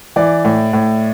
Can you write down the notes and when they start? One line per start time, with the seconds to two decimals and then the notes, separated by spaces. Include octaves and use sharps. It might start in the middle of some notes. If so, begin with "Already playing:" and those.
0.16 E3 D5
0.45 A2
0.73 A2